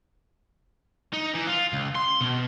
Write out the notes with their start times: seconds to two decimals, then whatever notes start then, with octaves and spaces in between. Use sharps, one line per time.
1.13 D#4
1.35 E3
1.47 F4
1.73 C#2
1.95 C6
2.21 B2